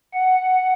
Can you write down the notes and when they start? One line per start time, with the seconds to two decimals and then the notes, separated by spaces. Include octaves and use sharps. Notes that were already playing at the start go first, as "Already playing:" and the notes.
0.13 F#5